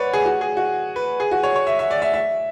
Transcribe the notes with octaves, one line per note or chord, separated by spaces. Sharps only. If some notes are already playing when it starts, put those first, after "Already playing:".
Already playing: B4 C#5 D5 F#5
G#4
F#4
G#4
F#4
B4
G#4
F#4
C#5
C#5
E5
E5
D5
E5
E5